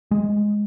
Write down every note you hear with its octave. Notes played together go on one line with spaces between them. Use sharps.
G#3